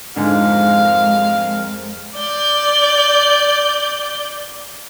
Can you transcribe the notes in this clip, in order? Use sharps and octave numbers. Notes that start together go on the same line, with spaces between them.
F2 G#2 D3 G#3 A#4 F5
D5 G6